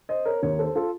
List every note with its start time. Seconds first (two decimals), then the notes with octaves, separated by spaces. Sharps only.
0.09 C5 D#5
0.25 A#4 C#5
0.42 D#2 D#3 A#4 C#5
0.59 A4 C5
0.75 F4 A4